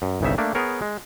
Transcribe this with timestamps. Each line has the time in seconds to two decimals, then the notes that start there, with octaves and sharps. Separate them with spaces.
0.02 F#2
0.21 G1 C2 C#3 D#4 E5
0.38 A3 A#3 D4
0.55 B3 G#4 A#4 C#5
0.82 G#3